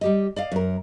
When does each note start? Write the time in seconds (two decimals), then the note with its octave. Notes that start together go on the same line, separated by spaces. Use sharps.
0.01 G3 G4 D#5
0.36 D5 D#5 F5
0.52 F#2 A#4